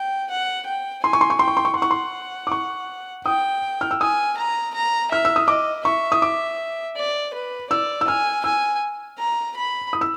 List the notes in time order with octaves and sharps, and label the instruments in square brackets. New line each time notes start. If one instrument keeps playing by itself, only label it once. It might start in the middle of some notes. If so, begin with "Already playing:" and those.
Already playing: [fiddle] G5
F#5
G5
[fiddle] G#5 [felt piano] C6
[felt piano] C#6
C6
C#6
[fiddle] G5 [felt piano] C6
[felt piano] C#6
C6
C#6
C6
[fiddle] F#5 [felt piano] C#6
[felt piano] C6
D6
C#6
[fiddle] G5 [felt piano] D#6
[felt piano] F6
E6
[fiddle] G#5 [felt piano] D#6
[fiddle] A#5
A#5
[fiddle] E5 [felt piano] F6
[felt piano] E6
D#6
[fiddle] D#5 [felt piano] D6
[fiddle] E5 [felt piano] C#6
[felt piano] D#6
D6
[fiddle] D5
B4
[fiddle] D5 [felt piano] E6
[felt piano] E6
[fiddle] G#5 [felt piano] F6
[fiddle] G#5 [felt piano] E6
[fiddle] A#5
B5
[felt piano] D#6
E6